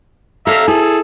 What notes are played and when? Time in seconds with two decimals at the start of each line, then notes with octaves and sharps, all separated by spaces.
0.47 A4 E5 F5 A#5
0.68 E4 G#4 A4